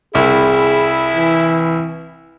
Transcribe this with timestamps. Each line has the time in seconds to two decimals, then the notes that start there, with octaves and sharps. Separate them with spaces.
0.15 C2 E4 G#4
1.16 E3